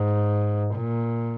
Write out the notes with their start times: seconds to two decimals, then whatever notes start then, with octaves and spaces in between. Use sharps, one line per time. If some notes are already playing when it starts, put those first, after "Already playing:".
Already playing: G#2
0.75 A#2